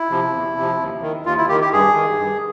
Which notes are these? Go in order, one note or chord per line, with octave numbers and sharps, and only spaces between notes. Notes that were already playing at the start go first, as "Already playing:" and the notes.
Already playing: E4
C3 F3
E2
C3 F3
D#2
D#3
D#2 F4
E4
D#3 G4
G4
G2 G#4
D#3
G2